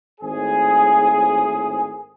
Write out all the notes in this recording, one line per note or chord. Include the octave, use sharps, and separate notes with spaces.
G#1 A2 G#4